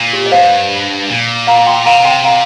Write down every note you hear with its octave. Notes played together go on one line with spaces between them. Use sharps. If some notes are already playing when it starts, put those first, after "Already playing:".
Already playing: A#2
G4
D#5
G2 C5 F5
A#2
F5 A#5
A#5
G5 C6
C3 F5 A#5
G5 C6
F5 A#5